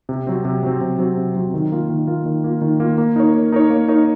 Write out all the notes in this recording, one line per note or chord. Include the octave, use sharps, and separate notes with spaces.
C3
F#3 C4
C3
F#3 C4
C3
F#3 C4
C3
F#3 C4
D#3
A#3 F4
D#3
A#3 F4
D#3
A#3 F4
D#3
A#3 F4
A#3
D#4 A#4 C#5
A#3
D#4 A#4 C#5
A#3
D#4 A#4 C#5